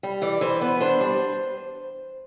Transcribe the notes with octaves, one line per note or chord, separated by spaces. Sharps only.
G3
E3 D5
E3 C5
B3 B4
D4 C5
G3